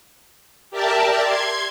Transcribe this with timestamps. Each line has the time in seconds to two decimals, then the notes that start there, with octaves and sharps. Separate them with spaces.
0.70 G4 A#4 D5 E5 A5
1.21 C6 G#6